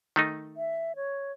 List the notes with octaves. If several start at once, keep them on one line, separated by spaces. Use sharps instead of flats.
D#3 A3 D#4
E5
C#5